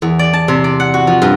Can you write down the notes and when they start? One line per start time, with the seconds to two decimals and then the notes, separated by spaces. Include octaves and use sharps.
0.02 E2
0.19 D5
0.33 A5
0.48 C3
0.64 D5
0.80 F#5
0.94 F#4
1.07 F3
1.22 G2